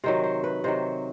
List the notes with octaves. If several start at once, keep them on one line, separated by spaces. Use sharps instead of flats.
C3 D#3 F#3 C5
C5
B4
C3 D#3 F#3 C5